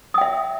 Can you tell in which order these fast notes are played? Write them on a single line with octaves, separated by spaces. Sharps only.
D#6 G5 E5